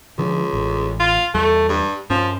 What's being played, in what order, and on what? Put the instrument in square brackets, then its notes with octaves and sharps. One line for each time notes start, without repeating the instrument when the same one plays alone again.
[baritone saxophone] C#2 [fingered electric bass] D3 F3
[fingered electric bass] A1
[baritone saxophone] F4
[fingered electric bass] E2 G3 [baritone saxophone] A3
[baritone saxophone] G2
[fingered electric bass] G2 C#4 [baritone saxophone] F3